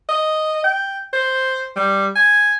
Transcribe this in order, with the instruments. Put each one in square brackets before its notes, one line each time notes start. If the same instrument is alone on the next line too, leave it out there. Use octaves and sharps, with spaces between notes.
[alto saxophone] D#5
G5
C5
G3
G#5